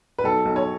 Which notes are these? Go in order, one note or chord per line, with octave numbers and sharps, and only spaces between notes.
B4
B1 A4
B1
C#5